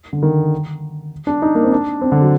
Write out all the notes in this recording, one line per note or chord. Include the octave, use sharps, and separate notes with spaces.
D3
D#3
D4
D#4
A#3
C4
D4
C4
D3
F#3